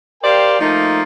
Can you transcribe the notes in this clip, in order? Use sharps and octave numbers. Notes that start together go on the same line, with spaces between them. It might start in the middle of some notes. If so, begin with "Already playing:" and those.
G4 A#4 C5 D5 F5 G5
F3 A3 A#3 D#4